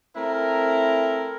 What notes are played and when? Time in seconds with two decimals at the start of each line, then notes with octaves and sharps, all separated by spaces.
0.16 A3 C4 E4 A#4